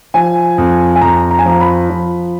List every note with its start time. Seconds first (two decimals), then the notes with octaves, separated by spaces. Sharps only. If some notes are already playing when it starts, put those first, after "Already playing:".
0.14 F3 G#5
0.58 F2
0.96 G#5
1.01 F2 A#5
1.31 A#5
1.39 G#5
1.46 F3 A#5
1.60 B5
1.90 F3